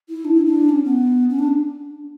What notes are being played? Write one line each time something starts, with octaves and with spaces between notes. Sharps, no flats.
E4
D4
E4
D4
C#4
B3
C#4
D4